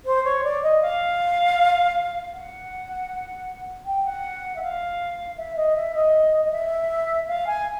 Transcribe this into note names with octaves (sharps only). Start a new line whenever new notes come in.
C5
C#5
D5
D#5
F5
F#5
G5
F#5
E5
F5
E5
D#5
E5
D#5
D#5
E5
F5
G#5